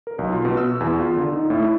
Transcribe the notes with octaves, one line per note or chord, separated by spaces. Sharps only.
A#4
B1
F4
B2
E6
E2
F4
D3
D#4
A2
E4